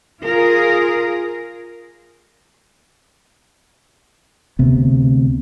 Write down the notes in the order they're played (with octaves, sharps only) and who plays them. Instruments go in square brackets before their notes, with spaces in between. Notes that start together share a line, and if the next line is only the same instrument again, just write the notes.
[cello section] F4 G#4 A#4
[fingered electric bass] D2 C3 B3